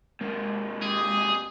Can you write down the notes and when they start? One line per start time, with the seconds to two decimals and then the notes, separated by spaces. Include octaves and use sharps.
0.21 C3 G#3 A#3
0.83 G4 G#4 D#6